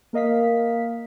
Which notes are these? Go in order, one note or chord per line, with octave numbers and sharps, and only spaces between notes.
A#3 A#4 D#5 F5 B6